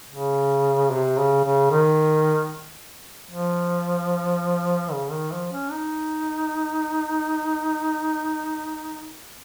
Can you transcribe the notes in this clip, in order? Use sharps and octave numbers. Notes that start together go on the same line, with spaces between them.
C#3
C3
C#3
C#3
D#3
F3
C#3
D#3
F3
C#4
D#4